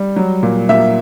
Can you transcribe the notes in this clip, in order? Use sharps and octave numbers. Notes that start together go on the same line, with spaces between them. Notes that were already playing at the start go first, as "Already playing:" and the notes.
Already playing: G3
F#3
A#2
A#2 E5